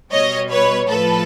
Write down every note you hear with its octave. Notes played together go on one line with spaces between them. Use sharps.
B2 G3 C#5 D#5
B4 C#5
A2 F3 A4 B4